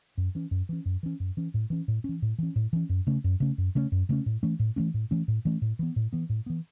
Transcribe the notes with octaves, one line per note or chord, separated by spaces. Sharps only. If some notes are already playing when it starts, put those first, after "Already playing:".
F#2
E3 C#4
F#2
E3 C#4
F#2
E3 C#4
F#2
E3 C#4
A2
E3 C#4
A2
E3 C#4
A2
E3 C#4
A2
E3 C#4
F#2
C#3 A3 C#4
F#2
C#3 A3 C#4
F#2
C#3 A3 C#4
F#2
C#3 A3 C#4
A2
E3 A3 C#4
A2
E3 A3 C#4
A2
E3 A3 C#4
A2
E3 A3 C#4
A2
E3 B3
A2
E3 B3
A2
E3 B3